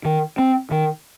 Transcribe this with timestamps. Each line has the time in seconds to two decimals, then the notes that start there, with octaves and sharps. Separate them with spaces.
0.05 D#3
0.39 C4
0.71 D#3